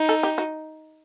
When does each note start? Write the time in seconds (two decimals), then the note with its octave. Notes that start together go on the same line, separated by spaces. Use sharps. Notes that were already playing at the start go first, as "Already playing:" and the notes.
Already playing: D#4
0.09 A4
0.23 G4
0.38 F#4